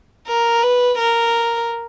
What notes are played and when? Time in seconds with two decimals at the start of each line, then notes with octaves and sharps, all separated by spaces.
0.27 A#4
0.62 B4
0.98 A#4